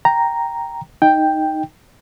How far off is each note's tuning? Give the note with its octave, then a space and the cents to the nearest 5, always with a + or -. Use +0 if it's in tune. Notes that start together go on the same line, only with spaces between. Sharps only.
G5 +0 A#5 +0
D#4 +0 G5 +5